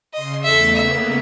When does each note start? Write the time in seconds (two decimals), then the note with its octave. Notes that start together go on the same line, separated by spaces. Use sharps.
0.14 C#3 D#5 C6
0.43 E2 A3 A4 E5
0.76 C#3 A#3 B3 E5